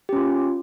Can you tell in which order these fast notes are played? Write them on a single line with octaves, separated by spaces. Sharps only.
G4 C#4 F4